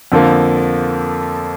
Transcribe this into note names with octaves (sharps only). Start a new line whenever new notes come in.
F2 D3 F3 A#3